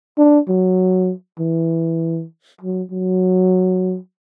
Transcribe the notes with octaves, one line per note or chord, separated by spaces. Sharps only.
D4
F#3
E3
F#3
F#3